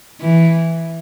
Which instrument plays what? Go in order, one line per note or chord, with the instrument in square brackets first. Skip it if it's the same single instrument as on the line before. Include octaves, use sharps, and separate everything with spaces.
[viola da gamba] E3